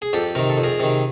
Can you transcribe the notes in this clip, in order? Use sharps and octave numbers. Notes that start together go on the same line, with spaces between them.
G#4
F2 G4 A4
C3 D#3 A#4
A4
F2
G#4 A#4
C3 D#3